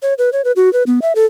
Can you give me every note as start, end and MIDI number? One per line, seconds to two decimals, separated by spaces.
0.02 0.14 73
0.18 0.30 71
0.33 0.42 73
0.44 0.52 71
0.56 0.72 66
0.73 0.83 71
0.87 0.99 59
1.02 1.13 76
1.15 1.26 69